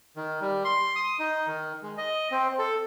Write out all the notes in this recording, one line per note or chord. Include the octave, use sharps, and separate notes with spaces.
D#3
G3
C6
D#6
D#4
D#3
G#3
D#5
C4
A4